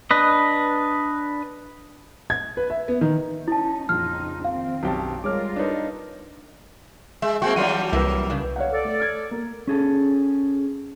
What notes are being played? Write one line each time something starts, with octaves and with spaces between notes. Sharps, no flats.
D4 B4 D#5
G#6
B4
E5
B3
D#3
C#4 D#4 E4 A5
A#1 F2 C#3 D#4 F4 F6
D#3 C4 F5
B1 F#2 G4 A5
G3 G#3 F4 A#4 C#5 D6 F6
D4 D#4 B4 C#5
G#3 E5
G#3 A#3 C4 F#4 G5 C#6
E3 F#3 G3 D4 F4 F#4 D#7
C2 A#3 E4 B4
C#3 D4
C#5 F5 F#5
A4 D5
A3
F6 G#6
A#3
C#4 G#4 A4